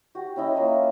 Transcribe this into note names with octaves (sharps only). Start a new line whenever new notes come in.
F#4 G4
C#4 E4 D#5 B5
A#3 F4 A#5 D#6